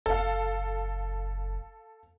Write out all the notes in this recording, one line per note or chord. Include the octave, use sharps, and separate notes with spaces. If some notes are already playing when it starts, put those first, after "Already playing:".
F#1 A4 F5